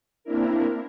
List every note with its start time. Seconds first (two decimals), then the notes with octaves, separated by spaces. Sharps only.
0.24 A#3 C4 D4 E4 A#4